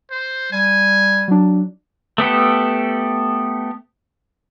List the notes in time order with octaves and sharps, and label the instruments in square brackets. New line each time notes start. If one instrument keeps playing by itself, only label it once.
[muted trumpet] C5
[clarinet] G3 [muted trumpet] G#5
[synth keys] F#3 D4
[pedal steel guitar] A3 B3 G4 A4